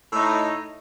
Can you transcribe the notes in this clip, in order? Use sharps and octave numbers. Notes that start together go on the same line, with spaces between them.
A2 A3 D#4